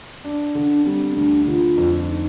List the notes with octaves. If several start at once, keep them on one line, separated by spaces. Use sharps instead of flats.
D4
D3
D4
G3 C4
C4
D2 D4
D3 F4
F2
D#4